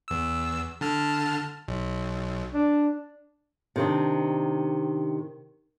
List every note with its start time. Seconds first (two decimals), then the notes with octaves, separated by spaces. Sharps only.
0.08 E2 E6
0.81 D3 A5 F6
1.68 B1
2.54 D4
3.76 C3 D#3 D4